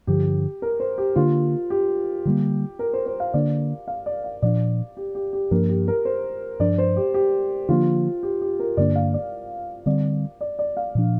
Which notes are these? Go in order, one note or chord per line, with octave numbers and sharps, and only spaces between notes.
G2 D3 F3 G4
A#4
C5
G4
D3 A#3 D4 F4
G4
D3 G3 A#3
A#4
C5
C5
F5
D3 A#3 D4 D5
F5
D5
F5
A#2 F3 D4 D5
G4
G4
G4
G2 F3 A#3 D4 A#4
G4
A#4
C5
G2 F3 D4 D5
C5
G4
G4
D3 F3 A#3 D4 F4
G4
G4
A#4
G2 D3 A#3 D4 D5
F5
D5
D3 G3 C4 D5
D5
D5
F5
A#2 F3 D4